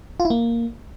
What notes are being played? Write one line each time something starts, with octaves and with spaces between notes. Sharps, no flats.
F4
E4
A#3